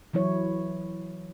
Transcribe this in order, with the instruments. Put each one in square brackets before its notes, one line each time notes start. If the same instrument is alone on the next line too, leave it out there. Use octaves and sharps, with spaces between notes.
[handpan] E3 F#3 E4 C#5